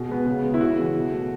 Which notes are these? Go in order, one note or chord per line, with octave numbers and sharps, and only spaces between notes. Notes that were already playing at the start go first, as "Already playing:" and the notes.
Already playing: B2 G#4
G#3 B3
C#3
G#3 B3
E4
C#3 F#4
E3 G#3
B2
A3